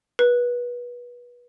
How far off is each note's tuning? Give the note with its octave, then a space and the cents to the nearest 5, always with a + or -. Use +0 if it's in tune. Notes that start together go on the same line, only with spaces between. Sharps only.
B4 -25